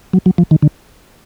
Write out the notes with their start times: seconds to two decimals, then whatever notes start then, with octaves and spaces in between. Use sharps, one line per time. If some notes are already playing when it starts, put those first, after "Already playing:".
0.13 F#3
0.26 F#3
0.38 F3
0.51 D#3
0.62 D3